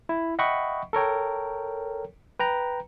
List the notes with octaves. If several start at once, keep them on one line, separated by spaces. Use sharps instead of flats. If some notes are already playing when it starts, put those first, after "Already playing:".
E4
D#5 E5 F#5 G5 B5 C#6
A4 A#4 C#5 G5
B4 G5 A#5